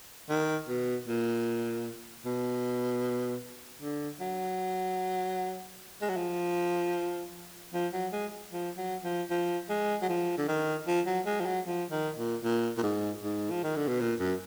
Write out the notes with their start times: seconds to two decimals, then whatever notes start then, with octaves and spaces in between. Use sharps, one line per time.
0.29 D#3
0.68 B2
1.07 A#2
2.25 B2
3.81 D3
4.20 F#3
6.01 G#3
6.09 F#3
6.17 F3
7.74 F3
7.93 F#3
8.12 G#3
8.52 F3
8.77 F#3
9.04 F3
9.30 F3
9.69 G#3
10.02 F#3
10.09 F3
10.38 D3
10.48 D#3
10.87 F3
11.07 F#3
11.26 G#3
11.40 F3
11.46 F#3
11.66 F3
11.91 D#3
12.17 A#2
12.44 A#2
12.77 A#2
12.83 G#2
13.23 G#2
13.51 F3
13.64 D#3
13.76 D3
13.88 B2
14.01 A#2
14.20 F#2